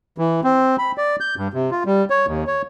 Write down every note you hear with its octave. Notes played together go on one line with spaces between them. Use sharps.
E3
C4
B5
D5
G6
G2
C3
F4
G3
C#5
D#2
C#5